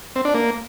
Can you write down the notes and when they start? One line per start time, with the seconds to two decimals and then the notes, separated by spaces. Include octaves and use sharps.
0.16 C4
0.25 D4
0.34 A#3